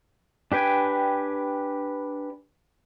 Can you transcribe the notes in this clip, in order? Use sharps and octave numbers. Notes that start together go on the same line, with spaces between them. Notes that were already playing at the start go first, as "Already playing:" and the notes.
D4 G4 B4 G5 G#5